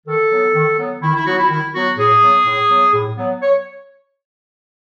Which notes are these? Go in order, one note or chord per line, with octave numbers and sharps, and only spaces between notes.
D#3 A4
F#3 B3
D#3
F#3 B3
D#3 E4
E4
F#3 B3 F#4
E4
D#3 E4
F#3 B3 F#4
A2 G#4
F#3 B3
A2
F#3 B3
A2
F#3 B3
C#5